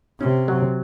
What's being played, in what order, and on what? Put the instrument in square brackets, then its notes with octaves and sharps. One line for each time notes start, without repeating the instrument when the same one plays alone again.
[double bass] C3 [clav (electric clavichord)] C#4
[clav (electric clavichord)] F#3